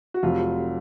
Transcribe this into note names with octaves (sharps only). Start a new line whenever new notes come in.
F#4
F1 F2 C3 F#3 F4